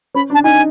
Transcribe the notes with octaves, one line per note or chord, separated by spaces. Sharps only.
C#4 B5
D4
A5
D#4 G#5